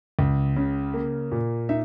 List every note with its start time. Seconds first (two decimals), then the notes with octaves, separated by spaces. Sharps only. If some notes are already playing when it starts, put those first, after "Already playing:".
0.19 C#2
0.56 C#3
0.94 A#3
1.32 A#2
1.69 D#4 E5